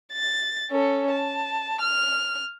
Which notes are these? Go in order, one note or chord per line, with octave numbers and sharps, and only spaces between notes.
A6
C#4 A4
A5
F6